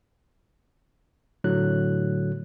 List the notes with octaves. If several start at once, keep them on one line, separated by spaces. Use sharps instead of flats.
A2 D3 F#3 F#6